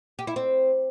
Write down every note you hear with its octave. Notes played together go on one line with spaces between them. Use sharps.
G4
E4
C4